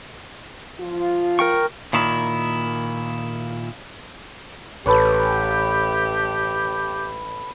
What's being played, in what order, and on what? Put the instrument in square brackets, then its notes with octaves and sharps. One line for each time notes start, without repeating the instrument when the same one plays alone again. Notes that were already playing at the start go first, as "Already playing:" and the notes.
[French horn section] F3 F4
[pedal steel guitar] A#4 G5 C#6
[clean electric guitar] A#2 D#3 E4
[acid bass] A1 [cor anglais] G4 [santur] A4 B4 C#5